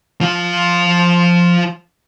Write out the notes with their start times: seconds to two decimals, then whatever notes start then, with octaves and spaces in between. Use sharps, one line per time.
0.21 F3 F4